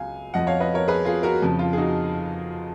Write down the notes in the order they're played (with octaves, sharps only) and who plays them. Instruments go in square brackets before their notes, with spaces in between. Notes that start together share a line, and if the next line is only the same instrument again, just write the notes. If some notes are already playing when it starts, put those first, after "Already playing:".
Already playing: [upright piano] C#2 C#3 F#3 F5 G#5
F2 F3 D#5 F#5
C#5 F5
B4 D#5
A#4 C#5
G#4 B4
F4 G#4
F#4 A#4
F2 C#3 F3
F4
G#4
D#4 F#4